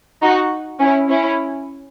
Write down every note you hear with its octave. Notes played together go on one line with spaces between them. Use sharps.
D#4 F#4
C#4 E4
C#4 E4